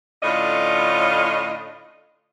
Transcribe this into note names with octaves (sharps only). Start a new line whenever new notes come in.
A2 D3 C#4 F4 D#5